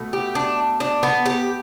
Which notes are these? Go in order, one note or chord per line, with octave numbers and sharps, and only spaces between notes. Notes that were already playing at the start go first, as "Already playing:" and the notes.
Already playing: B2 A3
G4
D4
D4
B3
G4